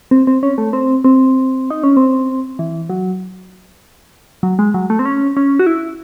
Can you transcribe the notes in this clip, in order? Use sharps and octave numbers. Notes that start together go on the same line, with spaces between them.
C4
C4
C#4
A3
C4
C4
D#4
C#4
C4
E3
F#3
F#3
G#3
F#3
A3
C4
C#4
C#4
F#4
E4